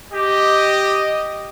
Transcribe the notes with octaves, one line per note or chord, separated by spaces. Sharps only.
G4 D#5